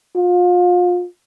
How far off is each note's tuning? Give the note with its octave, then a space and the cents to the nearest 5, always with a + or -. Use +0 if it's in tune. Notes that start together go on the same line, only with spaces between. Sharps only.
F4 +30